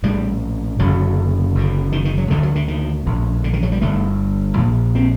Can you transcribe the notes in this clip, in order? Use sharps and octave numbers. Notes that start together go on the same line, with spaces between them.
A#1 A2 G3
F#1 F#2 D3 F#3
F#1 F#2 D3
D#3
D#3
F#3
D2 D3 D#3
F#3
D3
D#3
A#1 A2
D3
D#3
F#3
G3
G1 G2 D3 A3
A#1 A#2 A#3
C4